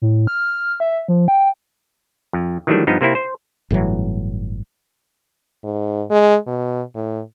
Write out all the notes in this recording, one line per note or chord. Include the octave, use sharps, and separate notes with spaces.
A2
F6
E5
F3
G5
F2
D#3 E3 F#3 G3 A3 D4
G2 F3 B3 D#4
C3 A#3 C4 E4
C5
G1 A2 E3 F#3
G#2
G#3
B2
A2